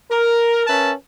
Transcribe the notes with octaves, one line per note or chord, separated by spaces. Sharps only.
A#4
C#4 A#4 B4 E5 A5